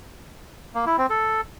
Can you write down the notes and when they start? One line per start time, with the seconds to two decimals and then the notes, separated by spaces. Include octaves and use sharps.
0.75 A#3
0.86 E4
0.98 C4
1.10 A4